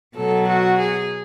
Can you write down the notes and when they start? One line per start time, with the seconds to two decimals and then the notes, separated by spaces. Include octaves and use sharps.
0.15 B2 F#3 A4
0.46 F#4
0.77 G#4